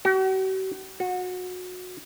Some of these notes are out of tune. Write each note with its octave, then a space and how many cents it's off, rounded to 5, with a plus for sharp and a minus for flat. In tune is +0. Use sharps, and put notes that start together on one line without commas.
F#4 +45
F#4 -25